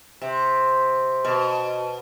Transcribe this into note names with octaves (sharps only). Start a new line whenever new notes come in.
C3
B2